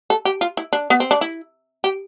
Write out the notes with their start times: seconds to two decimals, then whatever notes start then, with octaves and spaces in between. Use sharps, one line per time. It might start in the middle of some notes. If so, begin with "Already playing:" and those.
0.10 A4
0.25 G4
0.41 F4
0.57 E4
0.73 D4
0.90 B3
1.00 C4
1.11 D4
1.21 E4
1.84 G4